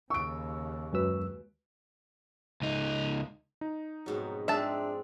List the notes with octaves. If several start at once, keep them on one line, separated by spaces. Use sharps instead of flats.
D#2 C#3 C#6 E6 D7
F#2 G#3 F#4 B4 E6
C#2 D#4
D#4
F2 G#2 B2 F#3
G#3 C4 D4 E5 F5 A5